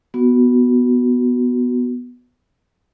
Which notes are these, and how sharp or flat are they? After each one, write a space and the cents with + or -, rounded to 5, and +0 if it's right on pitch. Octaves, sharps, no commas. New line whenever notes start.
B3 +0 F#4 +0